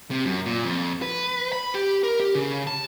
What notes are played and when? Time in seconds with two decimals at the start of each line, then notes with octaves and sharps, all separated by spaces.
0.11 C3
0.25 F#2
0.46 A#2
0.65 F2
1.02 B4
1.53 B5
1.75 G4
2.03 A#4
2.20 G4
2.35 C#3
2.67 A5